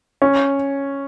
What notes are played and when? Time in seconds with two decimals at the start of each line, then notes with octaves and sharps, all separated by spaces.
0.22 C#4